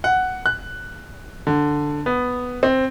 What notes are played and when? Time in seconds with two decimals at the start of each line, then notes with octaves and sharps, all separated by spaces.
0.04 F#5
0.46 F#6
1.47 D3
2.06 B3
2.63 C4